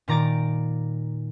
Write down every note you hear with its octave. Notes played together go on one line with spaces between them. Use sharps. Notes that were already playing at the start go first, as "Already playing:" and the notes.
A#2 D#3 A#5 D6 A6 D7